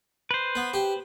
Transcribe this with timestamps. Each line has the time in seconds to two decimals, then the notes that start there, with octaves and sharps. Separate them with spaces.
0.31 B4 C5
0.55 B3
0.74 G4